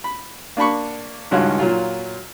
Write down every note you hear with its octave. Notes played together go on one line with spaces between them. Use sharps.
B5
A#3 D4 A5 B5 C#6
G#1 C#2 G2 F#4 C#5 F5
A#2 F#3 F4